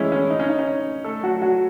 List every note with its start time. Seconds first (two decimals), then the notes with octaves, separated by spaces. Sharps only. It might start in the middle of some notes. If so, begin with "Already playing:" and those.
Already playing: E3 G#3 A3 C#4 E4 G#4
0.12 C#4
0.30 D#4
0.40 C#4
0.49 D#4
0.59 C#4
1.04 A3 A4
1.23 F#3 F#4
1.42 F#3 F#4